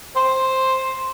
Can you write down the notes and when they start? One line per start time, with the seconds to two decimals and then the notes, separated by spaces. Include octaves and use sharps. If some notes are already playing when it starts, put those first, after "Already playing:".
0.16 C5